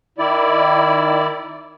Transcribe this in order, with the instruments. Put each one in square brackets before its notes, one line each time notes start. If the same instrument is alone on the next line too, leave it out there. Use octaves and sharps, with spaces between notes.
[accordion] D#3 E4 D5